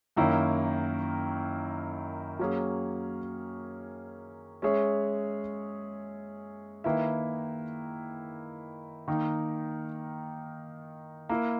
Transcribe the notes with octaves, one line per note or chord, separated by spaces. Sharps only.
F#2 D#3 A#3 C#4 E4
F#3 A#3 C#4 G#4
G#3 C#4 G#4 C#5 E5
D#3 A#3 E4 B4 E5
D#3 A#3 D#4
A#3 E4 A#4